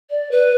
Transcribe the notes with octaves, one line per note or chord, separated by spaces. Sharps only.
D5
B4